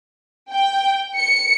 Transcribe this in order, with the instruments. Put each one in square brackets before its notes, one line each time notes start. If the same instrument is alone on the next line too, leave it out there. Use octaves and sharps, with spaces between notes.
[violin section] G5
C#7